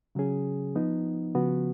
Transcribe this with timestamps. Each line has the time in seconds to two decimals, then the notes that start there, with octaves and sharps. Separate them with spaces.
0.15 C#3 F#3 C#4 G#4
0.75 F3 B3 D#4
1.35 C#3 F3 B3 F#4